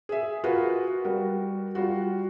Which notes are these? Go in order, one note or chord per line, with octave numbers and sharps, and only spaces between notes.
G#4 E5
F4 F#4 G#4 A#4 B4
G3 F#4 A#4
G3 F4 F#4